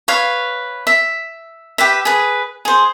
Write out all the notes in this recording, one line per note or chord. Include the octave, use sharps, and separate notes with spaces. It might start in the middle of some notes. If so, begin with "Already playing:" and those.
B4 C#5 F5
E5
G4 B4 E5
G#4 B4
G#4 C5